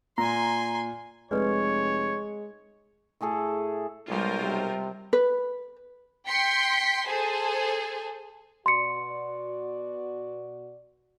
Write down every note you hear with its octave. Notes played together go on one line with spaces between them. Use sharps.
A#2 G#5 A#5 C6
F1 G#3 A4 B4 C#5 D5
A2 A3 G#4 A4
B1 G3 G#3 F4 A#4 C5
C3 G3
B4
G5 C6 B6 C#7
G#4 A4 C5 G#5
B2 F#4 D5 C6 C#7